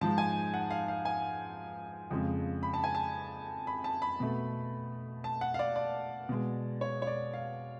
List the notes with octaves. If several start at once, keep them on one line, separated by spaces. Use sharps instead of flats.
G#2 F3 G#3 A5
G#5
F#5
F5
F5
G#5
F2 C#3 F3 G#3
B5
A5
G#5
A5
B5
A5
B5
B2 A3
A5
F#5
F5
D5
D5
B2 G#3
C#5
C#5
D5
F5